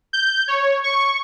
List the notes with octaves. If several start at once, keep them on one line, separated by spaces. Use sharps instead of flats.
G6
C#5
C#6